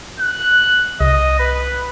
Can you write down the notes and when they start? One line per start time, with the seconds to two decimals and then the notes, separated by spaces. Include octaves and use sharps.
0.19 F#6
1.01 C2 D#5
1.40 B4